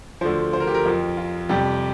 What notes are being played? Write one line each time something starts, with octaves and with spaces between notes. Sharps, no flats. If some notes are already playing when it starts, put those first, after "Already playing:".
D2 D3 F3 C5
C5
A#4
G4
A#4
F2 F3
F4
F2 C3 G3 G4